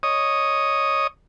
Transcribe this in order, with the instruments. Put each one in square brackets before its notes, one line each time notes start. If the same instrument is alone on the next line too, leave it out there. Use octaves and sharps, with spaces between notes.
[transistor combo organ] C#5 D#5 D#6